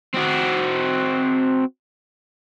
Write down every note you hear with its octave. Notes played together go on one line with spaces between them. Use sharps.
C4 F#4